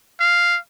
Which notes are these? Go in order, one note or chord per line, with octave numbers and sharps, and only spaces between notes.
F5